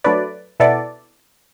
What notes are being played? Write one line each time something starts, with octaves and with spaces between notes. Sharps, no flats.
F#3 A3 D4 B4 D5
B2 B3 E4 A4 D5